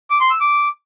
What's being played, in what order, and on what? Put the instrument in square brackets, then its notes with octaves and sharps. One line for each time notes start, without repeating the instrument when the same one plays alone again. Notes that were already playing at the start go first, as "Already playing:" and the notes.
[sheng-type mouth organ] D6
C6
E6
D6